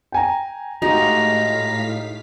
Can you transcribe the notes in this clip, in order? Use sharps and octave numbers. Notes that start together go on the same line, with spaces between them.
G5 G#5 A#5
A2 G#3 D#4 F#4 G4 F5 A#5 B6